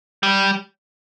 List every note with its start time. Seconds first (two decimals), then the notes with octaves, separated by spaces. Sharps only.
0.23 G3